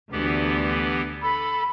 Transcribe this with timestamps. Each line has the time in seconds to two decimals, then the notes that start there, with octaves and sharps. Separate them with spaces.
0.12 D2 D3 E3 B3 G4
1.22 A4 B5